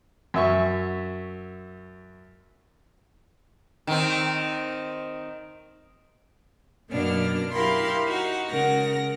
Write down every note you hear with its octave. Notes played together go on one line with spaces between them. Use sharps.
F#2 E5 C#6
D#3 C4
F#2 B2 A#3 D4 F6
E4 G4 A#4 F5 B5 C6
D#4 F#4
C#3 G#3 A#4 F#5 A#6